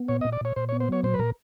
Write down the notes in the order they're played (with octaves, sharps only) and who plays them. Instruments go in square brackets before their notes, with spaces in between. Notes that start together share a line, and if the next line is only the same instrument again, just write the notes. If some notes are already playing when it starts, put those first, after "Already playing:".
Already playing: [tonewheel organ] B3
[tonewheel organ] A#2 [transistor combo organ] C#5
[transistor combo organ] D#5
[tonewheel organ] A#2
[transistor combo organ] D5
[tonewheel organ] A#2 [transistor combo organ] C#5
[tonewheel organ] A#2 [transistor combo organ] C5
[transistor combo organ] C#5
[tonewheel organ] B3
[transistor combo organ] C5
[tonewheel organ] F#3 [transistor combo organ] C#5
[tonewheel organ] A#2 [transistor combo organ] C5
[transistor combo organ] B4
[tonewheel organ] A#2 [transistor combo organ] A#4